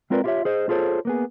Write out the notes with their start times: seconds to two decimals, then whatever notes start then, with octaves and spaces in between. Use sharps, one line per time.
0.10 G#3 C4 F4 A#4 B4 D5
0.24 E4 F4 G4 A#4 C#5 E5
0.45 G#4 C5 D#5
0.69 F4 G#4 A4 C5 C#5
1.05 A#3 B3 G#4